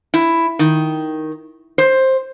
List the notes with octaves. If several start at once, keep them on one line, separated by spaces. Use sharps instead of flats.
E4
D#3
C5